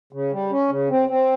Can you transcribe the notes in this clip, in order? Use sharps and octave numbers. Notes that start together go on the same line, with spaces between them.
C#3
G3
C#4
C#3
C4
C4